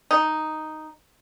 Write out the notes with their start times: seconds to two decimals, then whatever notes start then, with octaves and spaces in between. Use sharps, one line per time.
0.11 D#4